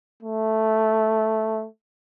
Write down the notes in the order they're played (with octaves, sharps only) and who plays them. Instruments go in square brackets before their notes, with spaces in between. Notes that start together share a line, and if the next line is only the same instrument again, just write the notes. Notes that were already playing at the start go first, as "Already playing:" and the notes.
[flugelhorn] A3